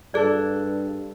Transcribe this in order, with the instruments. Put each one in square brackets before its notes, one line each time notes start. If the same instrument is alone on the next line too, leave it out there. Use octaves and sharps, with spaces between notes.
[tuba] G2 [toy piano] G#4 D5 [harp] A4 F#6